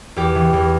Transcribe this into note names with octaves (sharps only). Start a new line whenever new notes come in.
E2 G4
E3
E2